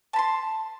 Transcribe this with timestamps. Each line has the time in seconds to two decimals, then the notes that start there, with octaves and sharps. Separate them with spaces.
0.13 A5
0.16 B5
0.19 C6